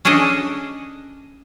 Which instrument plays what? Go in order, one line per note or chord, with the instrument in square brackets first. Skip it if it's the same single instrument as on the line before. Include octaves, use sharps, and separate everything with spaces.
[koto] C#4 D4 G#4 A4 D#5